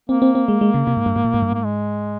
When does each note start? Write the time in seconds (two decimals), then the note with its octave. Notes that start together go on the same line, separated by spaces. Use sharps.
0.09 A#3 C4
0.22 C4
0.35 C4
0.48 G#3
0.61 G#3
0.74 C#3
0.87 C3
0.97 G#2
1.06 G2
1.16 G#2
1.25 A#2
1.34 G#2
1.42 G2
1.52 G#2 A#3
1.64 G#3